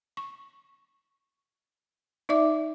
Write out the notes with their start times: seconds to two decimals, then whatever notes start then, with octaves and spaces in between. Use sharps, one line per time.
0.17 C#6
2.29 D#4 D5 E5 D6